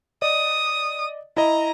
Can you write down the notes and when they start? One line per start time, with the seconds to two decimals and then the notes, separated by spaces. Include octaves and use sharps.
0.22 D5 D#5 D#6
1.37 E4 D#5 A#5